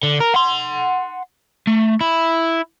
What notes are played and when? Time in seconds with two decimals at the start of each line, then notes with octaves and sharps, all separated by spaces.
0.03 D3
0.20 A#4
0.34 F#5 C6
1.67 A3
2.01 E4